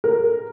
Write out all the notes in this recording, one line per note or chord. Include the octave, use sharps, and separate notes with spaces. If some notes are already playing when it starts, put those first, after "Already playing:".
A#4